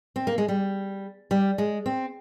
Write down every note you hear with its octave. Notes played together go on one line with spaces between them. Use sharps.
C4
A#3
G#3
G3
G3
G#3
C4